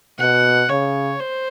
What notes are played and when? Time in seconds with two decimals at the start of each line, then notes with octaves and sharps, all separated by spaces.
0.19 B2 F#5
0.69 C#3 C#5
1.20 C5